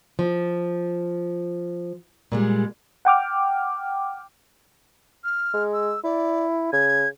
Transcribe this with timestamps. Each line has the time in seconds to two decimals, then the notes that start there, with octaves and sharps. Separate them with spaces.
0.19 F3
2.32 A#2 G3 G#3
3.05 F#5 G5 D6 F6
5.24 F6
5.54 G#3
5.73 E6
6.04 E4 D5
6.73 C#3 G#6